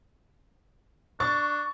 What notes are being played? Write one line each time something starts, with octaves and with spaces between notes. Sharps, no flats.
D4 C#6 A6